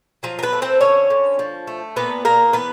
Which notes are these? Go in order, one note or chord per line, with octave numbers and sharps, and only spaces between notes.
F3 F#3 F4
A#4
B3 B4
A3
C4 C5
D3 C#4 C#5
D3
F3
A3
A#2 B3 B4
A#2 A#3 A#4
E3 B3 B4